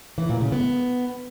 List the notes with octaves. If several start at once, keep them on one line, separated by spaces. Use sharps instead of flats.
E3
A#2
C#3
B3